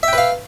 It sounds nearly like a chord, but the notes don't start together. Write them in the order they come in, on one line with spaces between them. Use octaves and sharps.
E5 G5 B4 F5